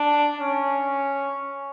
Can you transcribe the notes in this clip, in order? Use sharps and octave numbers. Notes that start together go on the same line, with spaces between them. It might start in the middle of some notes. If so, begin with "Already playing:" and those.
Already playing: D4
C#4